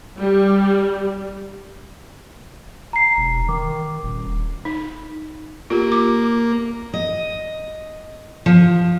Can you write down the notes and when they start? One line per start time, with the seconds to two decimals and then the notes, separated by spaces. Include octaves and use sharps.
0.18 G3
2.93 A#5 C7
3.17 E1
3.49 D#3 D6
4.03 D#1
4.65 D#4
5.70 A#3 F4 G4
5.92 D6
6.94 D#5
8.46 F3